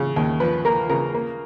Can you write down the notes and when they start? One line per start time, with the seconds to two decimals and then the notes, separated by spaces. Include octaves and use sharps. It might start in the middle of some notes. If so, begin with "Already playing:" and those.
Already playing: C#3
0.16 D#2
0.40 F3 B4
0.65 A#3 A#4
0.90 C#3 A#4
1.14 A#3